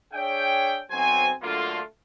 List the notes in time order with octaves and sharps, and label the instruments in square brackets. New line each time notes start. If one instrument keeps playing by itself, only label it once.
[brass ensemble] D4 G#4 C#5 E5 G5
B1 F#3 C4 C5 G#5
D3 F#3 A3 A#3 D4 F4